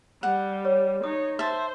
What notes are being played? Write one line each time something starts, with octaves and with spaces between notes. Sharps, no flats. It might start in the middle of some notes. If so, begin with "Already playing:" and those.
G3 F#5
C#5
D#4 C#5 D#6
C5 E5 A5